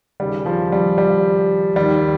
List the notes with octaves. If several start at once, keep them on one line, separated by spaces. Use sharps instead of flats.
D#2 C#3 G3
F3
G3
G3
D#2 D#3 G3